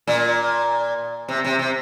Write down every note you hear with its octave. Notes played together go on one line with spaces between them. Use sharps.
A#2
C3
C3
C3